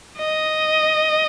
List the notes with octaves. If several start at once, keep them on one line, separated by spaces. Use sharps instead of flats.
D#5